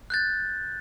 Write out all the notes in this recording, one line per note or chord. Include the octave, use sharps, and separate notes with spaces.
F#6 G6 A6